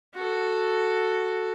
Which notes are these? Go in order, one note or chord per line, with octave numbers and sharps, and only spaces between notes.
F#4 A4